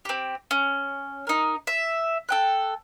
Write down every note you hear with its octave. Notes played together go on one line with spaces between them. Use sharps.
C4 G4
C#4
D#4 A#4
E5
A4 G5 F#6